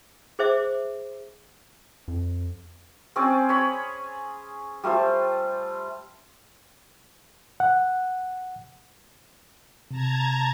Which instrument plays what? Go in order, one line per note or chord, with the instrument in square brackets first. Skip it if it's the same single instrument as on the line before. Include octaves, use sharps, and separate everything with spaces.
[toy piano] G#4 C5 E5 D6
[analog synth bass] F2
[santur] C4 C#4 G#4 D5
C#5 B5
G3 A3 F4 C5
[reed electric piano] F#5
[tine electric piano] C3 [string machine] A5 A#5 G#6